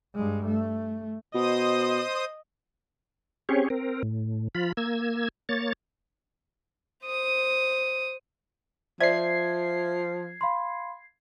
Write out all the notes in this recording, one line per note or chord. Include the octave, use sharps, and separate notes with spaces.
G2 G#3
A3
B2 C5 D#5 D#6
C4 C#4 G4 G#4 C#5
C4 A#4
A2
F3 F4 B5
A#3 E6 G#6
A#3 C#5 A6
C5 D#6
F3 C5 D5 E5 G#6 C7
F5 B5 C6